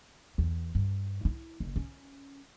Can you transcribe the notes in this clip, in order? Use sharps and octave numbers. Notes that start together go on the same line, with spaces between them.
E2
G2
E4
F#1
C#4